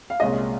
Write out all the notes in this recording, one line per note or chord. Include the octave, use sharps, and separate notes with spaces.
F5
C2 A#2 G#3 C#4 G#4 D#5